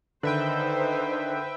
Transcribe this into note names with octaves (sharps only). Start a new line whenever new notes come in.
D3 D#3 D#4 B4 C5 E5 G5